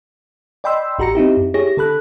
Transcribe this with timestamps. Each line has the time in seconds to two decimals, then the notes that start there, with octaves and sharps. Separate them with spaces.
0.64 D5 D#5 G5 B5 C6 E6
0.99 A1 F#4 G4 A#5 A#6 C#7
1.15 C4 D#4 E4 G4
1.37 F#2
1.54 E4 G4 G#4 C#5 A#6
1.77 D3 A4 B5 F#6